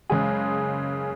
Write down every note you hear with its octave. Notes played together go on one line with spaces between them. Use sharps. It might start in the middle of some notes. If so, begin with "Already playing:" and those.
F#1 C#3 G#3 G#4